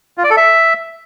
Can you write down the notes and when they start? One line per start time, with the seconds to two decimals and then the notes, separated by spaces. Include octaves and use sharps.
0.17 F4
0.24 D5
0.30 A4
0.37 E5